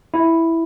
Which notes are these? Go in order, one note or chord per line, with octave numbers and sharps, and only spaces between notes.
E4